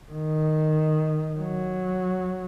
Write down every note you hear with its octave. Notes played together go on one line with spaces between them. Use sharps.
D#3
F#3